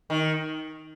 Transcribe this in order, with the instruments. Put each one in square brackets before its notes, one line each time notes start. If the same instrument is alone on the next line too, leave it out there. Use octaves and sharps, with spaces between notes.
[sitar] D#3